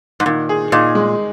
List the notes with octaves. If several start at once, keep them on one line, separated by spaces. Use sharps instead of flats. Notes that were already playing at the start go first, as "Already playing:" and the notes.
G#2
A#2 D#3
G#4
A#2 D#4
G#3